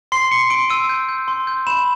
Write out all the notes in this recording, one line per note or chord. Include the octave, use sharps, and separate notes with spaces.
C6 C7
C6 C#7
C6 D7
E6 D#7
G6
G6
C6
G6
B5 E7